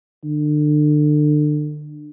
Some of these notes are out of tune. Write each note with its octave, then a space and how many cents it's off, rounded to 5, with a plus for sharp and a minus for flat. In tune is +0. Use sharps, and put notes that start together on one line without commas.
D3 +30